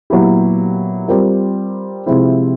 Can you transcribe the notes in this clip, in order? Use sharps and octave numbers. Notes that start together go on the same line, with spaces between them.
A#2 F#3 B3 E4 G4
G3 C4 F4 A#4
C3 F3 G#3 C4 E4